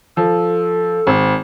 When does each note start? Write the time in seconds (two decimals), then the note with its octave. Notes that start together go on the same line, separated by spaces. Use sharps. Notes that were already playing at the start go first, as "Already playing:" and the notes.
0.17 F3 A4
1.07 G#1